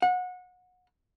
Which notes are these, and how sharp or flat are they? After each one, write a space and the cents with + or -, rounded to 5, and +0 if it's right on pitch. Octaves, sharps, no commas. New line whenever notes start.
F#5 -25